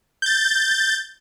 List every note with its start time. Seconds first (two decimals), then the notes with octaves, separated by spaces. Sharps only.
0.22 G6 A6